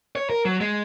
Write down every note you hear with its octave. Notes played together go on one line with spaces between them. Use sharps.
C#5
A#4
F#3
G#3